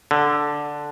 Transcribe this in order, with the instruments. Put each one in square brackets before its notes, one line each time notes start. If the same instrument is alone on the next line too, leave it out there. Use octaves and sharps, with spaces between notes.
[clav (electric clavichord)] D3